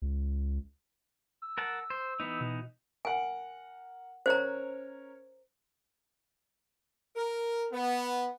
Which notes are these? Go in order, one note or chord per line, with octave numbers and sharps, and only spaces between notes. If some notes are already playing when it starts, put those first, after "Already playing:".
C#2
E6
A#4 F#5 A5
C5
E3 B3 D#4
B2
A#4 F#5 G#5
C#4 A#4 C5 C#5 A#5
A#4
B3